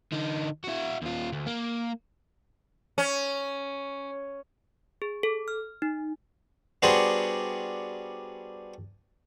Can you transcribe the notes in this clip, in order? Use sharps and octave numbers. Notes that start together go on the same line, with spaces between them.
D3 D#4
E4 F#4
D#2 F4
D2
A#3
C#4
G#4
A4
F6
D#4
G3 B3 D4 F#4 G#4 C5